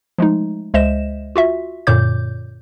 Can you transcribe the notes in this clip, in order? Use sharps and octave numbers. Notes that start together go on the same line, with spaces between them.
F3 G#3 A3 D#4
C#2 G#3 C5 D#5 E5 E7
F4 F#4 E5
F#2 A#2 D3 C#5 D6 G6